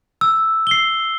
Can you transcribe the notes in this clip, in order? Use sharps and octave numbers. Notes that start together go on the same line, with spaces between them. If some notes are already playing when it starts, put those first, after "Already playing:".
E6
C7 G7